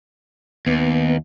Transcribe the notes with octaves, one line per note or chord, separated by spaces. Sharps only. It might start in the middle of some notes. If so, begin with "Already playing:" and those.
D#2 B3